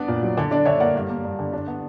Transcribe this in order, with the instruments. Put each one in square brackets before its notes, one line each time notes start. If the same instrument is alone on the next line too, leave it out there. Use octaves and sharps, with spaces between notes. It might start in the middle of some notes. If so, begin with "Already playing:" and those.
Already playing: [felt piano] B3 D4 D5
A#2
F#3
D3 D5
D4 D5
D3 C#5 E5
A#3 D5 F#5
G2
A#3
G2
D3
D4
B3